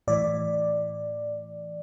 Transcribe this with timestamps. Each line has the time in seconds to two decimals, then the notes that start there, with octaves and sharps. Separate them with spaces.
0.08 A2 E3 D5